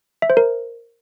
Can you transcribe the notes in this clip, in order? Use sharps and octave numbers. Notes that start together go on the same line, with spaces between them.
E5
C5
A#4